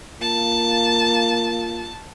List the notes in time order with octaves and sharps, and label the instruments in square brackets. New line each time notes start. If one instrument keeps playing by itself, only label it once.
[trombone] A#3 [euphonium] F4 [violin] A5